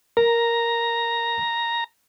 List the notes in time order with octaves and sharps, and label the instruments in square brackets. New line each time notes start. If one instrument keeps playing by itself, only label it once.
[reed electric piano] A#4 [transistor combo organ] A#5